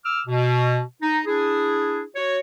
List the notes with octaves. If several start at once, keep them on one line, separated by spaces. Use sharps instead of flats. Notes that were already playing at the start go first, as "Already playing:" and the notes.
D6 E6 F6
B2
D#4
D4 E4 G#4
F#4 C#5